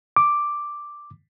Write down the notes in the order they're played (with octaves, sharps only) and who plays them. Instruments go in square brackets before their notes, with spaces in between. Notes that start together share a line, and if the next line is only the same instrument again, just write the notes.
[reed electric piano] D6